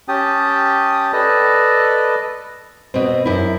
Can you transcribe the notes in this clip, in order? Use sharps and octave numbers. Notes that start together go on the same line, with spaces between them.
C#4 G4 G5 A5 D#6
A4 B4 D5 D#5
B2 C4
F#2 E4